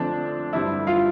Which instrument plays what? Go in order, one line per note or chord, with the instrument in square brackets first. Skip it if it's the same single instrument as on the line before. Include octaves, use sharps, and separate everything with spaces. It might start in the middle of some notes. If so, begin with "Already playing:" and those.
Already playing: [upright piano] F2 D3 A3 C4 D4
G2 D3 G3 C4 E4 E5
F4 F5